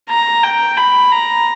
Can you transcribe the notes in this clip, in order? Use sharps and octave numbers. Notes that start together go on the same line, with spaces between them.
A#5
G5
B5
A#5